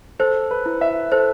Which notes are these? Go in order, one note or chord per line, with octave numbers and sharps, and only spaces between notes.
A4 C5
B4
E4
E5
A4 C5